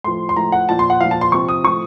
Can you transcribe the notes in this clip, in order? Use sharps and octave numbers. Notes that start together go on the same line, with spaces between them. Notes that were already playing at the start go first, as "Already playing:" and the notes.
A2 F3 C6
C6
A2 F3 A#5
F#5
A#2 F3 A5
C6
F#5
A#2 F3 F5
A5
C6
C3 F3 C#6
D#6
A2 F3 C#6